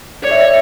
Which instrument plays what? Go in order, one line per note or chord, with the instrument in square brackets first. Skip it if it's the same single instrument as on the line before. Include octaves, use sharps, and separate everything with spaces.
[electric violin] C#5 [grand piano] D5
[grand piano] E5
D5
E5